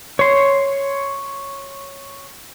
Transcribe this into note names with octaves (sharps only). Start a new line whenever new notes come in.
C#5 C6